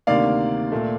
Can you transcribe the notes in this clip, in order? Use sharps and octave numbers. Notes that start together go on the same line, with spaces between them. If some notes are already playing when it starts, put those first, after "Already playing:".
D2 C3 D#3 A#3 D5 F5
A#2 A3